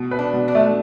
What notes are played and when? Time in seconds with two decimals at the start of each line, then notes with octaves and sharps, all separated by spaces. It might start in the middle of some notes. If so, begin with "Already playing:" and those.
Already playing: B2
0.11 B4
0.19 D4
0.33 B2
0.48 D4
0.55 A3